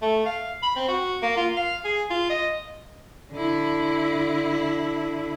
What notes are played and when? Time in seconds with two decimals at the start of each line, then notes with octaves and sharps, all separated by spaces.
0.02 A3
0.26 F5
0.63 B5
0.76 C4
0.88 F#4
1.23 A#3
1.37 F4
1.57 F5
1.85 G#4
2.10 F4
2.30 D#5
3.32 D3 E4